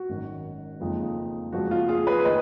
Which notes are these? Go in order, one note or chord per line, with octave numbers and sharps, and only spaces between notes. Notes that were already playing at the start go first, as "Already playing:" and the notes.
Already playing: F#4
G#1 F#2 D#3
F#1 F2 F3 G#3 D#4
F#1 F2 F3 G#3 F#4
F4
F4 G#4
G#4 B4
D#3 B4 D#5